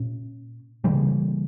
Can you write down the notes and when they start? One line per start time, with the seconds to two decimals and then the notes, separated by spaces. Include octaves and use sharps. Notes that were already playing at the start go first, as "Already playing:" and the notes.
Already playing: A#2 C#4
0.84 C#3 E3 G3 A#3